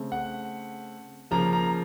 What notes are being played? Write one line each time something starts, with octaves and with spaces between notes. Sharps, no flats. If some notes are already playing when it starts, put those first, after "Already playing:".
Already playing: C#3 A3 C4
F#5
C#3 F3 A#3 A#5
A#5